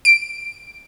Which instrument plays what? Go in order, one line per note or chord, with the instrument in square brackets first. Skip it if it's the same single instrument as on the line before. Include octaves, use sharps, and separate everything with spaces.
[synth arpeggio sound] D7